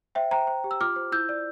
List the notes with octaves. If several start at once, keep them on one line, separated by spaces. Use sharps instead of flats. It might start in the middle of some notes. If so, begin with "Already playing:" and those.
C5 E5 G5
C5 G5 A#5
C5
G4
E6
F4 D6 F6
C5
E4 E6 G6
D5